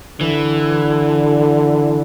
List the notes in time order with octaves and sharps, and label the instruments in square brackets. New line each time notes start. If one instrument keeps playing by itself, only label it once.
[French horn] D3 [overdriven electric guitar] E3